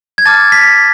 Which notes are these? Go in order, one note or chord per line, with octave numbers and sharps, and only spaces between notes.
G#6
A5 D6 F6 A6
B6